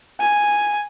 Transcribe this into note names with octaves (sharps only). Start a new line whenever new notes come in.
G#5